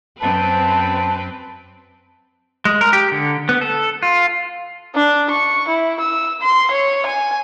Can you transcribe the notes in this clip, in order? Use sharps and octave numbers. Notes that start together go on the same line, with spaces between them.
F#2 C4 B4 A5
G#3
A#4
G4
D3
B3
A4
F4
D4
C#6
E4
E6
C6
C#5
G#5